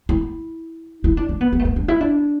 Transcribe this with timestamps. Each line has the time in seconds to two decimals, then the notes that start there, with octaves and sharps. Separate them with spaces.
0.09 E4
1.04 E4
1.17 D4
1.29 D4
1.41 B3
1.52 B3
1.60 A3
1.65 B3
1.76 D4
1.88 E4
2.01 D4